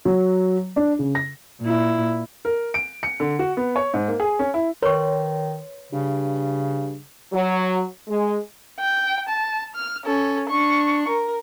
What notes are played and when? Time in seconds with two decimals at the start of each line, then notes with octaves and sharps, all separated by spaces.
0.05 F#3
0.76 D4
0.99 C#3
1.15 A#6
1.61 A#2 E4
2.45 A#4
2.74 D7
3.03 C#7
3.20 D3
3.39 F#4
3.57 B3
3.76 C#5
3.94 G#2
4.08 A#3
4.20 G#4
4.39 C#4
4.54 E4
4.82 D#3 A#4 B4 C#5 C6 C#6
5.92 G2 C#3
7.33 F#3
8.08 G#3
8.80 G5
9.28 A5
9.75 F6
10.05 C#4 A4
10.48 D4 C#6
11.08 A#4